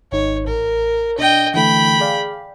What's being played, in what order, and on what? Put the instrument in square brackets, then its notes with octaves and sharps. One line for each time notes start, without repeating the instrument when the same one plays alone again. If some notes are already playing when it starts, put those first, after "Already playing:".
[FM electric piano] G#1 D#4 [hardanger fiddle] C#5
[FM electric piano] A1 [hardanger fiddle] A#4
[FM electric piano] B2 D4 [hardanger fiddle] D#5 G5
[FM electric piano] D3 E3 A3 [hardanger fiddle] G5 B5
[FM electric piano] G#4 D5 F5